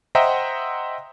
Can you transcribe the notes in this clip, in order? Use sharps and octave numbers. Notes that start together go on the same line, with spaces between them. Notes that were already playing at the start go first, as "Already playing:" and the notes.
C5 D#5 E5 F#5 G5 A#5